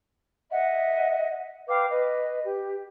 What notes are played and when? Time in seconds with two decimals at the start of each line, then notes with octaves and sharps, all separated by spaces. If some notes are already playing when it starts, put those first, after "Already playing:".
0.51 D#5 E5 F#5
1.69 B4 F5 G5 D6
1.90 B4 D#5
2.44 G4